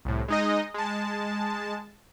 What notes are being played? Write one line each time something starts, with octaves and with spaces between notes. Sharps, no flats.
C2 A2
G#3 D#4 D#5
G#3 A5